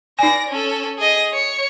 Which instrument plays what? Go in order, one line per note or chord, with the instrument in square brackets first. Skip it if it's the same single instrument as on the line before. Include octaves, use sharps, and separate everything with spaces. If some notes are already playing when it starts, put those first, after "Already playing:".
[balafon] D#4 G#5 [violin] D5 A#6
[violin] C#4 A4
G#4 D#5
C#5 C#7